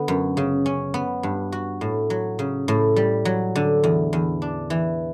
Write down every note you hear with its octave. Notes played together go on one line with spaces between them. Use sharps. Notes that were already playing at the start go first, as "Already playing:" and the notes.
Already playing: D3 B3
F#2
C#3
C#4
B3
G2
F#4
A2
F#3
C#3
A2
G3
F#3
D3
E2
E2
D4
E3